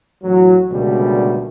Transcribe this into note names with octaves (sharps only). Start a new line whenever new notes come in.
A1 F#3
C#2 B2 D3 G3 A3 A#3